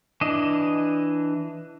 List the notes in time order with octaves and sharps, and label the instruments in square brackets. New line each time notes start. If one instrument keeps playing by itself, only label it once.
[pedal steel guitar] E3 D4 D#5